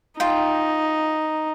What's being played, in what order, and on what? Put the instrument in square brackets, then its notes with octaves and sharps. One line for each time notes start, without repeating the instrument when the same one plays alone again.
[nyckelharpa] D#4 [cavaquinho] F4 G5